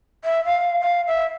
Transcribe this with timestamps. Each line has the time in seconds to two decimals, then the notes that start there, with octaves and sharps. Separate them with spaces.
0.24 E5
0.45 F5
0.80 F5
1.07 E5